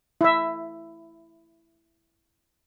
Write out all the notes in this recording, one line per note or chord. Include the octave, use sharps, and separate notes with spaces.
E4 E5